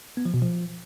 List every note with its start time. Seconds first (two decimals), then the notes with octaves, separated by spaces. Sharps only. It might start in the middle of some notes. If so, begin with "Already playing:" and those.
0.17 B3
0.25 F3
0.34 B2
0.42 F3